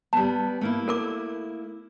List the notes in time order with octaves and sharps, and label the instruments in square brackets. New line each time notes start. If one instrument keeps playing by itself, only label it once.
[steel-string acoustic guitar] G3 B3 [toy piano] A5
[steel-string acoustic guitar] A3 A#3 E4
[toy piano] A4 A#4 D6